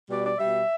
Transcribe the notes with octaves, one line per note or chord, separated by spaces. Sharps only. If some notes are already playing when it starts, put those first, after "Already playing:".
B2 G3 D5
D5
B2 G3 E5